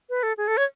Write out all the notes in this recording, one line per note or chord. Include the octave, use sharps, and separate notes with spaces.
B4
A4
G#4
A4
C#5